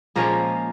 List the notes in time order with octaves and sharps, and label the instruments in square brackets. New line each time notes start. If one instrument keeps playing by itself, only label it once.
[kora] A#2 F3 G#3 A#3 C#4 A#4